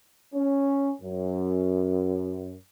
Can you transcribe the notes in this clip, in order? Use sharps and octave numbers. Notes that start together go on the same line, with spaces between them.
C#4
F#2